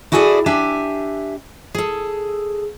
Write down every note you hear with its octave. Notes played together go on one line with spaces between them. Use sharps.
E4 F#4 G#4 A4 C#5 D5
D4 G4 E5 G#5
G#4 A4